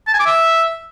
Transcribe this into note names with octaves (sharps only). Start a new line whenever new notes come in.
A5
G#5
D6
E5